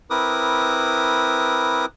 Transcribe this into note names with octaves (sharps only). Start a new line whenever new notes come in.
C4 E4 A#4 B4 D6 D#6